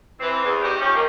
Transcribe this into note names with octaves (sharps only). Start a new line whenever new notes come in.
E3 C4
E2
D#4 F#4 G4
F3 A3 C#4 G4
D#3 A#3